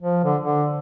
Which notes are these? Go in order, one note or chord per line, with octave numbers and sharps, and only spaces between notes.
F3
D3
D3